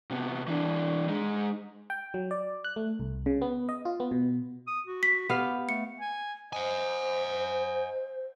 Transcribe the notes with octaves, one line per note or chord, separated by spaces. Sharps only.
C3 B3
E3 D4
G#3 D#4
G5
F#3
D5
F#6
A3
C2
C#3
B3
D#5
F4
B3
B2
D#6
F#4
B6
B3 G4 F5
A3 C#7
G#5
C5 D#5 F#5 G#5